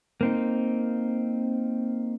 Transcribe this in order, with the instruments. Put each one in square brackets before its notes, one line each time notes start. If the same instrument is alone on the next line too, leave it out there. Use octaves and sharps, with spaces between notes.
[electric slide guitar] A#3 C4 D#4